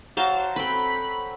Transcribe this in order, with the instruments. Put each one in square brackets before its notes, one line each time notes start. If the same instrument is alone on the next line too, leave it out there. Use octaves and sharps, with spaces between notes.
[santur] F#3 F#4 [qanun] C5 F5 A5
[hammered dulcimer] C4 A4 [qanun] B4 G5 [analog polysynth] B5